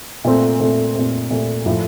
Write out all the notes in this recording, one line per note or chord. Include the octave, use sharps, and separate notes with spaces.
A#2 A3 C4
A#2 A3 C4
A#2 A3 C4
A#2 A3 C4
A2 F3 A3 E4